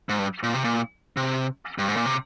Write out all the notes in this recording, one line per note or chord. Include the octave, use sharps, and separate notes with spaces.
G#2
G2
A#2
C3
A#2
C3
G2
G#2
A#2
C3